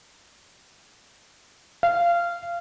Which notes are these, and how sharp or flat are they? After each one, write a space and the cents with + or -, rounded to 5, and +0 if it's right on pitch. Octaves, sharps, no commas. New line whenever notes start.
F5 -20